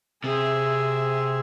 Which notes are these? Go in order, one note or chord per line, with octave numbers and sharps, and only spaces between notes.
C3 G#4 E5